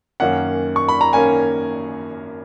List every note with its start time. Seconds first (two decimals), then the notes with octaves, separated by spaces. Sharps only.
0.20 F#2 D#3 A#3 C#4 F#5
0.76 C#6
0.89 B5
1.01 A#5
1.13 D#3 A#3 C#4 G#5